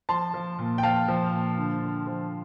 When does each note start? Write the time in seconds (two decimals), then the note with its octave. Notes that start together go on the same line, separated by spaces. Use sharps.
0.09 F3 A5 C6
0.34 F3
0.59 A#2
0.78 G5
0.83 F3 F5 A5
1.08 F3
1.33 A#2
1.57 D3
1.82 D3
2.07 F3